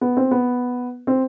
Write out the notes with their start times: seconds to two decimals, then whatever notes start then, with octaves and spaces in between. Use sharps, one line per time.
0.01 B3
0.17 C4
0.31 B3
1.07 C4